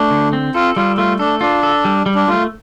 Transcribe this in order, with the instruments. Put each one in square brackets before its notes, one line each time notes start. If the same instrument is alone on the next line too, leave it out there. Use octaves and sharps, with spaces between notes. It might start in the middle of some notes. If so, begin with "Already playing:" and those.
Already playing: [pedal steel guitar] A3 [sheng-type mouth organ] D4
[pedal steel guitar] D3
C4
[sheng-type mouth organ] F4 [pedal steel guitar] A4
[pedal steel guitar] G3 [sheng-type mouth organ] F4
[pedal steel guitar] A3 [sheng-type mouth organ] F4
[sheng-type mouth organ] D4 [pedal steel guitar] A4
[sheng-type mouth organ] D4 [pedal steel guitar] F4
[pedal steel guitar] A4
G3
G3
[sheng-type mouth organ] D4
[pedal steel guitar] A3 [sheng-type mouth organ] F4